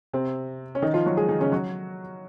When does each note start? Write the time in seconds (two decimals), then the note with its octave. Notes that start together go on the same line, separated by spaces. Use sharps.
0.13 C3 C4
0.75 C#4
0.82 D#3 D#4
0.94 F3 F4
1.06 F#3 F#4
1.17 G#3 G#4
1.29 D#3 D#4
1.40 C#3 C#4
1.52 F#3 F#4